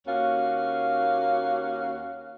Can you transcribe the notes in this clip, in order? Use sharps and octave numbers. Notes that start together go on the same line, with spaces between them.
D#2 A#3 C#4 F#4 F5